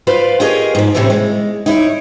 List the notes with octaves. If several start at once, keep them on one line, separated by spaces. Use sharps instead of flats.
F4 B4 C5 D5 F5
F4 G4 G#4 A#4 C#5 D#5
G#2 F3
A2 C3 E3 A3 C4 C#4
G#3
D#4 E4 C#5